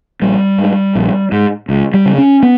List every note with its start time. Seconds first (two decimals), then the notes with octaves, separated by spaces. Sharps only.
0.22 A#1 G3
0.58 G#2
0.95 A#1
1.32 G#2
1.69 C#2
1.94 G3
2.06 C#3
2.18 C#4
2.43 B3